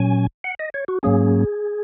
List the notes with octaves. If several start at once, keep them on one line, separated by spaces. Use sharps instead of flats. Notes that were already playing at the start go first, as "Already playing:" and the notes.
Already playing: A#2 F#3 C#4 G#5
F#5
D#5
C#5
F#4
G#2 F#3 A#3 C#4 G#4